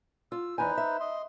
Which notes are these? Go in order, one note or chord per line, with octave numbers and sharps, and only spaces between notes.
F4 E6
E2 D#4 B4 C5 G#5
E5
D#5 C6